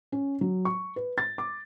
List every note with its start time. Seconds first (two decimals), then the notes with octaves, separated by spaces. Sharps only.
0.12 C#4
0.41 F#3
0.65 C#6
0.96 B4
1.18 A6
1.38 D6